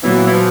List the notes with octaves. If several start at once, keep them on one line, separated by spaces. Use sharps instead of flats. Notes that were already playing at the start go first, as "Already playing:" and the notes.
A#2 E3 F#3 B3
E3
F3